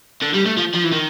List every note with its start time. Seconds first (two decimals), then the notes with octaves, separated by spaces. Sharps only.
0.22 D3
0.34 G3
0.45 A3
0.57 F3
0.74 F3
0.84 E3
0.92 D#3